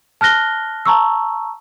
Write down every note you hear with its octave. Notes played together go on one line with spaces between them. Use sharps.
A5 F6 F#6 A#6 G7
A5 A#5 C#6 E6